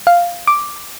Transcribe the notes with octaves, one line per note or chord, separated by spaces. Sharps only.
F5
D6